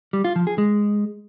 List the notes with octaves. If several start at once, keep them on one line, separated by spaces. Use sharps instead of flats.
G3
F4
F3
G#4
G#3